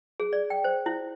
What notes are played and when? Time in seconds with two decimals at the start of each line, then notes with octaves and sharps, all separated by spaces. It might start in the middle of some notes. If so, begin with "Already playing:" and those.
0.20 G#4
0.33 D5
0.50 G5
0.64 C5
0.86 E4